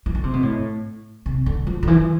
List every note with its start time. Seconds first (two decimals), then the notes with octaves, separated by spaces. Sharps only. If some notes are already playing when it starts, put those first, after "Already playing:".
0.06 E3
0.15 D3
0.24 C3
0.33 B2
0.43 A2
1.26 C3
1.46 D3
1.67 F3
1.83 D3
1.87 E3